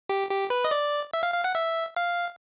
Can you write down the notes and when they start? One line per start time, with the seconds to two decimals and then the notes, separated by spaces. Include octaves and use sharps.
0.09 G4
0.30 G4
0.50 B4
0.65 D#5
0.71 D5
1.13 E5
1.23 F5
1.34 F5
1.44 F#5
1.55 E5
1.96 F5